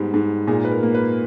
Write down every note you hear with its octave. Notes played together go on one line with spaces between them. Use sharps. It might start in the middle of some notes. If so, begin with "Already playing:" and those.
Already playing: G#2 G3 B3
G#2
A#2 G#4
B4
A#4
A#3
B4